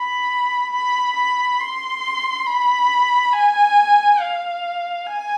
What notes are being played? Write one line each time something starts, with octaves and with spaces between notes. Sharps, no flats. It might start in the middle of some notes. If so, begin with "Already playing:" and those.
Already playing: B5
B5
B5
C6
B5
G#5
F5
G#5